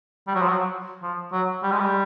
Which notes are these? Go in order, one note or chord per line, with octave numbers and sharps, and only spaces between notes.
G3
F#3
F3
F#3
F3
F#3
G3
G#3
G3